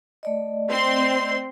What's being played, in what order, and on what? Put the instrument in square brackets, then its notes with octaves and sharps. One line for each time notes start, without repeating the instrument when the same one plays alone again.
[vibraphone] A3 D5 D#5
[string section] C4 C6